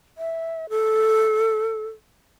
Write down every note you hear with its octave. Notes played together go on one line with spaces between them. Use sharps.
E5
A4